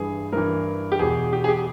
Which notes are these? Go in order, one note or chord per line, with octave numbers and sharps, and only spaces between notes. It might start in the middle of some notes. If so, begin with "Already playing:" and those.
Already playing: G2 E3 G#4
G2 E3 A#4
G4
E2 B2 G#4
G4
G#4
G4